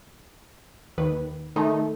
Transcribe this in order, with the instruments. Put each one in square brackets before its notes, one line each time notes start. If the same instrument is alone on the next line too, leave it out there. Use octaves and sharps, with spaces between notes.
[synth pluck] D#2 D#3 B4
[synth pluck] D#3 D#4 [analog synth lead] A3